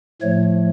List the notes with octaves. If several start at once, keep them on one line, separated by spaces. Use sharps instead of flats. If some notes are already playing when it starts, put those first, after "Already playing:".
A2 F3 A3 C#5